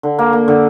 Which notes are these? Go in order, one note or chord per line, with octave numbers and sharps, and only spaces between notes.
D3
A#3
A#3
D3